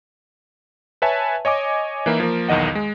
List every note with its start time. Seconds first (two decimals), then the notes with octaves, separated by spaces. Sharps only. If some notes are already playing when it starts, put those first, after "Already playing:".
1.02 B4 C#5 E5 G#5 A5
1.45 C#5 D#5 G#5 D6
2.06 E3 A#3 D#4 E4
2.20 F3 A#3
2.48 B1 E2 D#3 D#5 F#5
2.75 G#3